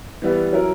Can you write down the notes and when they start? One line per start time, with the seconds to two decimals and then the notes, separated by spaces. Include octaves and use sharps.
0.22 E3 G3 B3 E4
0.53 F#3 C#4 E4 A#4